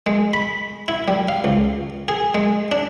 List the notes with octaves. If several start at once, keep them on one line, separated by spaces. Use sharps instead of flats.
G#3
B5
E4
G3
F5
C#2
G#4
G#3
D4